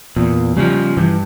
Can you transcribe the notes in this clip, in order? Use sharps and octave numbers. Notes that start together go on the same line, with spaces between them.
E2 A#2
C#3 F3 G3
G2 E3